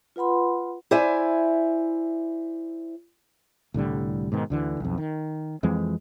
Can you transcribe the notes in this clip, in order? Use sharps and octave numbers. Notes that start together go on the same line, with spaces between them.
F4 B4 F#5 B5 C6
E4 C5 D5 E5 G#5
C2 A2 D3 G3
G#2 B2 D#3
D2 D3 E3
B1 F2
D#3
F2 E3 G#3 C4